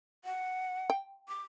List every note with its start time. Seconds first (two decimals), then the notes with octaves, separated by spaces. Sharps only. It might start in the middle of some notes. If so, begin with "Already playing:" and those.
0.25 F#5
0.90 G5
1.28 D6